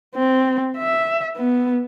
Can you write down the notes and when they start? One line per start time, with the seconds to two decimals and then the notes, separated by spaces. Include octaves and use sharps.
0.15 C4
0.77 E5
1.37 B3